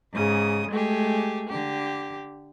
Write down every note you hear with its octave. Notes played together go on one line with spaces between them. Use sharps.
G#2 C#3 D#6
G#3 A3 G4 G#4
D3 G4